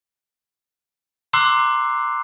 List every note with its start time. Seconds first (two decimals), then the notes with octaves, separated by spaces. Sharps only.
1.33 A#5 C6 D6 E6 F#6 C7